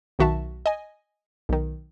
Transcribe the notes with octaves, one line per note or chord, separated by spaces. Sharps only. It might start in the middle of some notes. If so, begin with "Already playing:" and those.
B1 D#3 F#4 E5 A5
D#5 G#5
B1 D#3